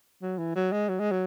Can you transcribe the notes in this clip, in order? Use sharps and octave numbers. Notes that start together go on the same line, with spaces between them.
F#3
E3
F#3
G#3
F#3
G#3
F#3